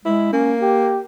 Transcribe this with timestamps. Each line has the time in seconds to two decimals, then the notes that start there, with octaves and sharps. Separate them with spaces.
0.05 G#3 E4
0.33 A#3 C#4
0.62 G4